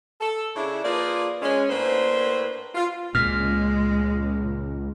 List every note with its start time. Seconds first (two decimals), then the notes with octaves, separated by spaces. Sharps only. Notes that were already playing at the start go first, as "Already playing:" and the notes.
0.21 A4
0.56 C#3 D4 E4
0.85 F3 A#3 F4 G#4 B4 D5
1.42 G#3 C#4
1.70 A2 A#3 D4 B4 C5
2.75 F4
3.15 C#2 A#2 G#3 F6